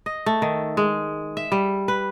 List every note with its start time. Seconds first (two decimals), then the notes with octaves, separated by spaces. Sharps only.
0.06 D#5
0.26 A3
0.42 D#3
0.77 G#3
1.37 E5
1.52 G3
1.88 B4